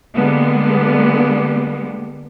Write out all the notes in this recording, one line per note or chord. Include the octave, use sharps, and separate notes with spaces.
D3 G3 G#3 A#3 B3